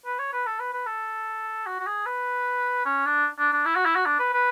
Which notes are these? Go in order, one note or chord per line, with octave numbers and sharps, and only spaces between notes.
B4
C#5
B4
A4
B4
B4
A4
F#4
F#4
G#4
B4
C#4
D4
D4
D4
E4
F#4
E4
F#4
D4
B4
B4